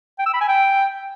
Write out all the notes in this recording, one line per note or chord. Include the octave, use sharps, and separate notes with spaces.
G5
E6
B5
G#5
G5